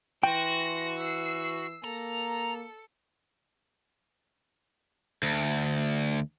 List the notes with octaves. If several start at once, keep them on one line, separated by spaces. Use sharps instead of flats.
E3 F#4 G5 C6 A#6
E6 C7
A#3 A4 A#5
D2